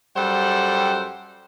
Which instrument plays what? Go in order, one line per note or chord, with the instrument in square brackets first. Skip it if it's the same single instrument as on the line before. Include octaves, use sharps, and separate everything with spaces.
[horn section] F#2 G3 A4 C5 F#5 G5